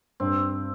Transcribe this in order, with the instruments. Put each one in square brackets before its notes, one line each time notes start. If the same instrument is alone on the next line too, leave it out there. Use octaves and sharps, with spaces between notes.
[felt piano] G2 [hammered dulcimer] C4